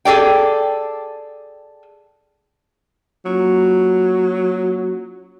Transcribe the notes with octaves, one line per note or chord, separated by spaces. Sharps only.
G#4 A4 D5 G5
F#3 A#3 C#4 F4